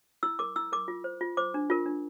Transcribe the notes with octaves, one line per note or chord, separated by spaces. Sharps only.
E4 E6
A#4 D6
E4 E6
A#4 D6
F4
C5
F4
C5 D6
D4
F4 A#4
D4